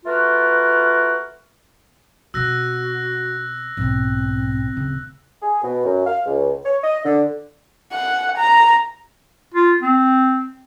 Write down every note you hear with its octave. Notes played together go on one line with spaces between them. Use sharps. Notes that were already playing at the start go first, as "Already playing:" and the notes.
A3 F4 F#4 A#4 B4
B2 C4 F#4 E6 F#6 A#6
B1 G#2 B2 C4
D1 C#3
G#4
B2
F#2
F5
C#2
C#5
D#5
D3
F#5
A#5
F4
C4